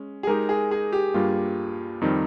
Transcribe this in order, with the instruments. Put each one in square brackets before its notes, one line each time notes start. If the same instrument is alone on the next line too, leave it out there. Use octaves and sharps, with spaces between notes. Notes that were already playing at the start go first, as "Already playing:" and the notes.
Already playing: [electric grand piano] G#3 C#4
[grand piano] G#4
[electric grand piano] G#3 D#4 G4 [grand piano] A#4
[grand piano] G#4
G#4
G4
[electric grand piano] G2 G3 A#3 [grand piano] F4
[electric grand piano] F2 D#3 G3 C4 D#4